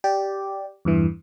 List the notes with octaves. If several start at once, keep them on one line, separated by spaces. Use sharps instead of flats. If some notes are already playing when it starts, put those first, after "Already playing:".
G4 D5
E2 G2 E3